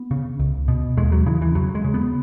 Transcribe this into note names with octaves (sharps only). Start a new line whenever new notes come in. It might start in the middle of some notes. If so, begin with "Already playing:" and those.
Already playing: B3
C#3
C#2
B2
D#2 G#3
F#3
C#3 E3
E3
E2 F#3
G#3
C#3
B3